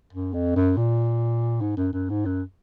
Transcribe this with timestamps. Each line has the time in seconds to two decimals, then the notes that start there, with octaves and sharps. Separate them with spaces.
0.13 F#2
0.34 F2
0.56 F#2
0.77 A#2
1.61 G#2
1.77 F#2
1.93 F#2
2.10 G#2
2.25 F#2